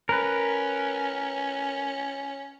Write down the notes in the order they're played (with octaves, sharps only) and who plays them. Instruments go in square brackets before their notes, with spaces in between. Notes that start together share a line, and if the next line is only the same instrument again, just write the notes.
[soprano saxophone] C#4 [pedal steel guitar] A#4 B4